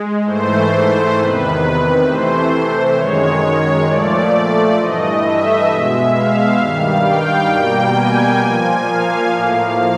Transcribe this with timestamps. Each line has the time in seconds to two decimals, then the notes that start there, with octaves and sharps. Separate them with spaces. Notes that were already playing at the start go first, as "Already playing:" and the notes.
Already playing: G#3
0.23 G#2 E3 A3 C5
1.14 E2 C3 D#3 B4
2.04 C3 E3 A3 C5
2.95 F#2 D#3 G#3 C#5
3.85 A#2 F3 A3 D5
4.76 G2 E3 A3 D#5
5.22 E5
5.67 B2 G#3
6.12 F5
6.58 G2 D#3 G3
7.02 G5
7.47 B2 G3 A#3
7.93 G#5
8.39 A#2 F3 A#3
8.83 F5
9.28 A2 F3 A#3